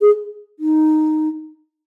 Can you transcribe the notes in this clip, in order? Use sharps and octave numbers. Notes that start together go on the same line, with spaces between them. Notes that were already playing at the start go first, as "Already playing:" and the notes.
G#4
D#4